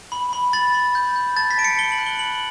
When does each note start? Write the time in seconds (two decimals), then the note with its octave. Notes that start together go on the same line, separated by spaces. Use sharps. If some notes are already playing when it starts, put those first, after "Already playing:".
0.12 B5
0.33 B5
0.53 B5 A6
0.74 B5
0.95 G6
1.16 G6
1.37 A5 A6
1.51 B6
1.58 A5 D7
1.64 C#7
1.78 B5 G7
1.92 F#7
1.98 F#6
2.06 G7
2.19 B5 F#7